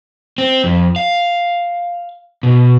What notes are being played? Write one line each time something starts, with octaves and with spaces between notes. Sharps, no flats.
C4
F2
F5
B2